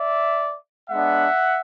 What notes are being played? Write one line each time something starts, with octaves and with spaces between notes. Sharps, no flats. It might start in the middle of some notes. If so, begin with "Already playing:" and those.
Already playing: D5 E5
G#3 B3 D4 E5 F#5